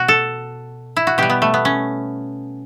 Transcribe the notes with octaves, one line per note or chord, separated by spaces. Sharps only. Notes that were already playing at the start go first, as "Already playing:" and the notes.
Already playing: B2 F#4
A4
E4
F#4
B2 G3 G4
B3
A3
B3
C#4